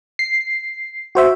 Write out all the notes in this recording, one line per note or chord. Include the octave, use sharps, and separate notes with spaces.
C7
F#4 C5 E5